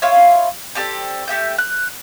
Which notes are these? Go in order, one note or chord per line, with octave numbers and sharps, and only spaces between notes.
E4 F4 C#5 F5
C4 G4 A4 D5
A3 G4 E5 G6
F#6